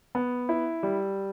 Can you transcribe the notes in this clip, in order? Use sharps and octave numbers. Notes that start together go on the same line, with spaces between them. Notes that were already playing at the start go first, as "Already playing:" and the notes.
B3
E4
G3